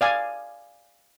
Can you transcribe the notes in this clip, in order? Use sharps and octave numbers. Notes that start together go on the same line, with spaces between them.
D5 F5 G#5